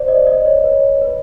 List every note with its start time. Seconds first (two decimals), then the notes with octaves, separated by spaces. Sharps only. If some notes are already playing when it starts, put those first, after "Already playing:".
Already playing: C5 D5
0.08 D#5
0.27 D#5
0.45 C#5
0.64 B4
1.02 B4